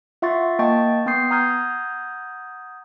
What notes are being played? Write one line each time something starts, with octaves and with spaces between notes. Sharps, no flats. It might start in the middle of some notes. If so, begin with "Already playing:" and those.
F4 E5 F#5 C6 C#6 A6
A#3 D#5 G5 A5 C#6 A6
B3 G5 C6 D#6 G6 C7
F#5 A#5 D#6 F6 G6 G#6